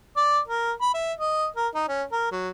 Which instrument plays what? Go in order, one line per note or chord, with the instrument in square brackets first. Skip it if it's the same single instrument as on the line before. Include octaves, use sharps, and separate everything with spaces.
[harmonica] D5
A#4
B5
E5
D#5
A#4
D#4
C#4
A#4
F#3